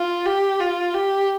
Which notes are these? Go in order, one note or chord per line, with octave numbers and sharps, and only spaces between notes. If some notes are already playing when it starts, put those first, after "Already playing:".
Already playing: F4
G4
F4
G4